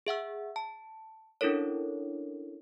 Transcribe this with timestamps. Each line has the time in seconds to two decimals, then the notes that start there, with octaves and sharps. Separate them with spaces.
0.07 G#4 E5 F#5 E6
0.56 A5
1.41 C#4 D4 E4 A4 A#4 C#5